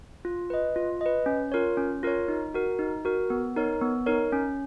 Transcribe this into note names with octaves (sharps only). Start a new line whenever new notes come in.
F4
B4 D#5
F4
B4 D#5
C#4
F4 A#4 C#5
C#4
F4 A#4 C#5
D#4
F#4 A#4
D#4
F#4 A#4
B3
D#4 A#4 C#5
B3
D#4 A#4 C#5
C#4